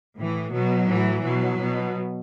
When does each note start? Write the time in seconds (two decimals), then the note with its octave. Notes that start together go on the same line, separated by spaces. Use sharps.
0.16 A2 E3
0.52 B2 F#3
0.88 A2 E3
1.24 B2 F#3
1.60 B2